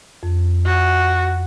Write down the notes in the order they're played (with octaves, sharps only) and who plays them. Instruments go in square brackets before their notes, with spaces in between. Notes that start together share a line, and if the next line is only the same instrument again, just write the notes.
[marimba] F2
[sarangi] F#4